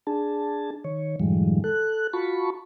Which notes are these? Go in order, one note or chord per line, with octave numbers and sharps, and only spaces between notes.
D4 G#4 A5
D#3 C#5
F#2 A2 D#3 F3 G3 G#3
A4 F#6
F4 F#4 A5 B5 C#6